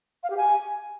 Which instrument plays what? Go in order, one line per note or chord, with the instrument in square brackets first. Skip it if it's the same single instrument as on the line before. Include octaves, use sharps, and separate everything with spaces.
[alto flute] F5
G4
G#5